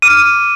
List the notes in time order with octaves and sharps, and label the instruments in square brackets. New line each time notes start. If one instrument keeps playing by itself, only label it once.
[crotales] D6 F6 D#7